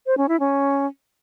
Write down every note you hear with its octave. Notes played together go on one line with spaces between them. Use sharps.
C5
C#4
E4
C#4